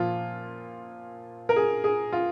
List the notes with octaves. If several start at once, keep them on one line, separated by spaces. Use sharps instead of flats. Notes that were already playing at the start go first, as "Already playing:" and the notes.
Already playing: A#2 F3 F4
A#4
G#4
G#4
F4